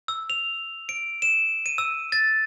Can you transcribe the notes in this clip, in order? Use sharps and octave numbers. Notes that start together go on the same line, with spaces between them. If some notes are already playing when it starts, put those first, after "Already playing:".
E6
F7
D7
E7
D#7
E6
A6